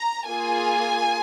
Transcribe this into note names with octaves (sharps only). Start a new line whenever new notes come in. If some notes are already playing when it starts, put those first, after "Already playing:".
Already playing: A#5
A#3 F4 G#4 G#5